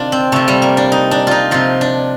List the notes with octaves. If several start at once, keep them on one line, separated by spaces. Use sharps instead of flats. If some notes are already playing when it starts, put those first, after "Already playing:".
Already playing: C3 D#3 D4 F4
C4
C3 F3 A3
G3
A#3
D4
D#4
D4
D#4 F4
C3 F3 F4
D4